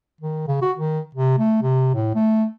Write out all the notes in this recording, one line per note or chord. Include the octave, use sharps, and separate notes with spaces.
D#3
C#3
F#4
D#3
C3
A3
C3
A2
A3